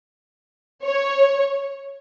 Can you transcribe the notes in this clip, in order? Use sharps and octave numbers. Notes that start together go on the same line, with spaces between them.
C#5